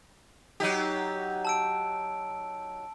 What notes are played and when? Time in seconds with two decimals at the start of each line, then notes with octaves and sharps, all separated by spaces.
0.60 F#3 D#4 G4
1.45 A5 E6 D7